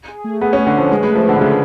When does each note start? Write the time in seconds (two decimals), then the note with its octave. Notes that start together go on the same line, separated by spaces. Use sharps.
0.08 G#4
0.24 A3
0.41 B3 G#4
0.53 C#4
0.58 A3
0.67 D3
0.75 F3 C#4
0.91 G#3 B4
1.03 G#3
1.08 A3
1.15 F3
1.24 D3 B4
1.36 D3
1.41 C#3 A3